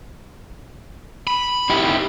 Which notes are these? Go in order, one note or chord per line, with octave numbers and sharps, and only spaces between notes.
B5
D#4 E4 G4